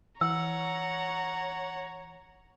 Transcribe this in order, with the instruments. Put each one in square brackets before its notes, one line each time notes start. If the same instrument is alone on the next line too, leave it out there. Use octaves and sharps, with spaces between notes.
[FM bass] E3 [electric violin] C#5 A#5 [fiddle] F#5 [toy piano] E6